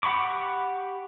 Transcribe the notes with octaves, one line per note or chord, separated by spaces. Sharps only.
G4 F#5 B5 C#6 D6